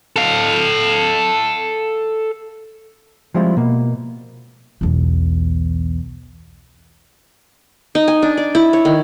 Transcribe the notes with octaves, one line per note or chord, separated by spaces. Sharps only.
A4 F5
F3 G3 G#3 C4 E4 F4
B2 A#3
B1 E2
D#4
G#5
D4
D5
E4
C#5
D#3